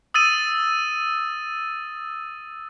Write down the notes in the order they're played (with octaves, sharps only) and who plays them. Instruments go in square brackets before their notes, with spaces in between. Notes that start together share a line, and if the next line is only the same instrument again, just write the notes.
[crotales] D#6 E6 A6 D#7